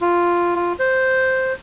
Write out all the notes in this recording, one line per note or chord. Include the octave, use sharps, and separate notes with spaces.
F4
F4
C5